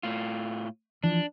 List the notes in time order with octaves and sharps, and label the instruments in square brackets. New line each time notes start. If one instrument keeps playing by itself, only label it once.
[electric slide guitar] A2 F4
[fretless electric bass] E3 F3 [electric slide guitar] D4